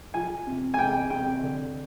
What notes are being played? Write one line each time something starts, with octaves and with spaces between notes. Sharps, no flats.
F3 G#5
C3
G#5
C3 G5
C3 G5
D3